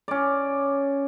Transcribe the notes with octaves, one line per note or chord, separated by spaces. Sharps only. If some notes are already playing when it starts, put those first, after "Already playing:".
C#4 D5